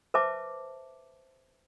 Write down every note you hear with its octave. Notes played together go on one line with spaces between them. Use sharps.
B4 C5 E5 A5 D6